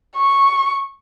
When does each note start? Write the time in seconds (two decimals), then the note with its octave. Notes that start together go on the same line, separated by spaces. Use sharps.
0.16 C#6